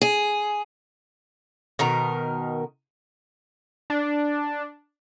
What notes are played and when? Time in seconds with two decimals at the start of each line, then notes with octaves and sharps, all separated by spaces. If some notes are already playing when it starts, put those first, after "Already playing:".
0.02 G#4
1.79 B2 D#3 A#4
3.90 D4